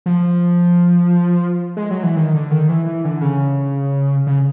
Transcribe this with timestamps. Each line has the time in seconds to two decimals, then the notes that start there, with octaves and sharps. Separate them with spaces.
0.06 F3
1.77 G#3
1.91 F#3
2.03 E3
2.16 D#3
2.34 D3
2.51 D#3
2.69 E3
2.86 E3
3.05 D3
3.21 C#3
4.27 C#3